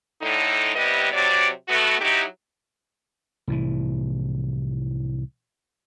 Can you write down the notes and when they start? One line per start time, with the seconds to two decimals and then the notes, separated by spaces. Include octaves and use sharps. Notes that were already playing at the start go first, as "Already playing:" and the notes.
0.22 A2 D3 D#4
0.76 C3 G3 B3 E4 B4 D#5
1.13 C3 F#3 D5
1.68 A3 B3 F#4
2.01 F#3 D#4 E4 F#4 G4
3.48 C2 A2 E3